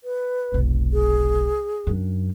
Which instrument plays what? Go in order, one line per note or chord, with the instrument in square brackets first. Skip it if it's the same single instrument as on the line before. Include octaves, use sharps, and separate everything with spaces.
[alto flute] B4
[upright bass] F1 B1
[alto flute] G#4
[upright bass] F#2 D4